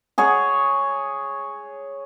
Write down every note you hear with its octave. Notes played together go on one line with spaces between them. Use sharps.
G#4 C#5 F#5